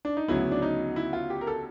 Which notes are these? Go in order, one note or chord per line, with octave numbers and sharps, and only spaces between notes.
D4
D#4
D2 C#3 F#3 B3 E4
D4
D#4
E4
F4
G4
A#4
A4